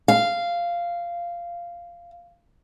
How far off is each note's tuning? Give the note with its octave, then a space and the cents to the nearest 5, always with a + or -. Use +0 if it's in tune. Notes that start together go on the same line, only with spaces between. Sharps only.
F5 -10